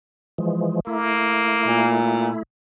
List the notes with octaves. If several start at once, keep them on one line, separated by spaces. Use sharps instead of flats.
E3 F3 G#3
A3 A#3 E4
A#2